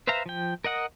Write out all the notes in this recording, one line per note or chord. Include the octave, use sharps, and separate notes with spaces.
B4 C5 E5 F5 A#5
F3 G5
A#4 D#5 F#5 D#6